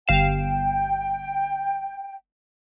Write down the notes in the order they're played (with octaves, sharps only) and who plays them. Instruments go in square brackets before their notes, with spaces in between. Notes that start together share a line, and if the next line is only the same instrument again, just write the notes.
[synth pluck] G1 F5 E7 [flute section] G5